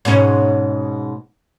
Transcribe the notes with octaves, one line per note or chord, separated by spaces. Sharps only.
G#2 B2 C#4